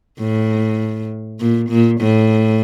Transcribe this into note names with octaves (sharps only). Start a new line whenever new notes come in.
A2
A#2
A#2
A2